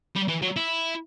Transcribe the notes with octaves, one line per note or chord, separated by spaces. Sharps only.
G3
E3
F#3
E4